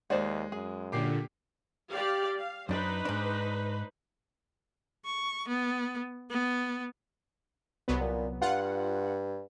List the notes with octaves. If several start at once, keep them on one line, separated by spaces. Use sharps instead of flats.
D#2 G#3 C5 D5 F#5
F#2 G#4
A#2 D3 G4 D6 C7
G4 D5 F5
F5
F#2 D4 D#4 B4 C5
G#2 D4
C#6
B3
B3
C2 F#3 B3
A#2
G2 F4 F#5